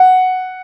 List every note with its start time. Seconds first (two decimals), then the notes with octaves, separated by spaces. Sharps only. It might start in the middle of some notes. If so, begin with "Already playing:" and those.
Already playing: F#5